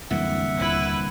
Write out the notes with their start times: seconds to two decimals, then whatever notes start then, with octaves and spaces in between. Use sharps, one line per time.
0.11 C2 F2 D3 E3 G#3 A#3 E5 F#5
0.59 D#1 E4 B4